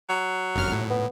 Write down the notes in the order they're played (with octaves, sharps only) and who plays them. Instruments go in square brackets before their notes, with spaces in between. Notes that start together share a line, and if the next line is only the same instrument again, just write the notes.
[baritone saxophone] F#3
[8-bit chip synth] G1 F#2 F6
A2
[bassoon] B3